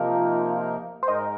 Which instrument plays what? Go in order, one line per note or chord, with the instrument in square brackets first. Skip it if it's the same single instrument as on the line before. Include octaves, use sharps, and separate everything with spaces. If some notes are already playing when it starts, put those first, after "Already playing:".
Already playing: [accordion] C3 F3 A#3 D#4 A#4 [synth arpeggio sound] F4
[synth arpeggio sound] C5
[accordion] G#2 G#3 D#4 A#4 [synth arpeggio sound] D#5